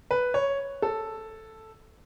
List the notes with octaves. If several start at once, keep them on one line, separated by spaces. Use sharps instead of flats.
B4
C#5
A4